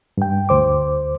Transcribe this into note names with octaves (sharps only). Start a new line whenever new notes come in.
G2 G5
D2 C5 D6